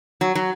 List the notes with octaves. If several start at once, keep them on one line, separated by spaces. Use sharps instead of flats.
F#3
F#3